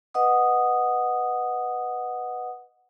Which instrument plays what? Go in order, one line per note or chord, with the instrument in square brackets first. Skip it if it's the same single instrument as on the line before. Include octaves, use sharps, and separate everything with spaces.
[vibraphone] B4 D#5 F#5 D#6